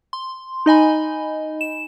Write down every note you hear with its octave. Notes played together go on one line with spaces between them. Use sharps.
C6
D#4 D#5 G#5 B5
E7